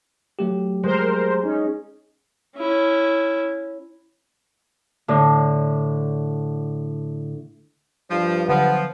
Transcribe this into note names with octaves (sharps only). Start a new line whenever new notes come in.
F#3 A3 G4
G#3 A#4 C5
C#4 D#4
C#4 E4
A2 D3
G2 F3
D3 F3 F#3 B3